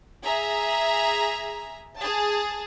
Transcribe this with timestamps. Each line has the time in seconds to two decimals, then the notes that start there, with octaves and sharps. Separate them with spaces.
0.23 G#4 E5 A#5
1.98 G#4 A5